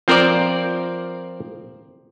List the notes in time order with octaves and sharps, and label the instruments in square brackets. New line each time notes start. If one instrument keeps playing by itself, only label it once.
[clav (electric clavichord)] F3 C4 A#4 C5 D5